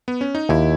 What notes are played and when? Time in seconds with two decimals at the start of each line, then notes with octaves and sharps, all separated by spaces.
0.08 B3
0.21 C#4
0.35 D#4
0.49 D#2 E4